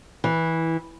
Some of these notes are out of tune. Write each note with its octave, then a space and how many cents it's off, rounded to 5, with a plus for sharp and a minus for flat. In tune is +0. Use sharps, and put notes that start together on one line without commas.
E3 -10